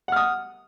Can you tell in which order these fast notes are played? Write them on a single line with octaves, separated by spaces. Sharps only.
F#5 F6 D#6